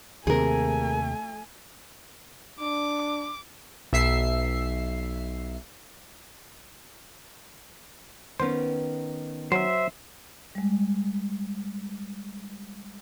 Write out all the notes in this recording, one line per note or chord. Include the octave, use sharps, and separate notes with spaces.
D#2 C3 A3 G#4 A#4 G#5
D4 D6
B1 E5 C7
D#3 B3 C#4 C5
F#3 C5 E5
G3 G#3